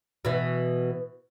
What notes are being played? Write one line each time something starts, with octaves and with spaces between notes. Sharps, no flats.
B2 E3